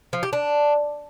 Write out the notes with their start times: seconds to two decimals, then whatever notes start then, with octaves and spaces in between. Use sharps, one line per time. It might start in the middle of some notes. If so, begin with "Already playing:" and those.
0.13 F3
0.23 G4
0.33 D4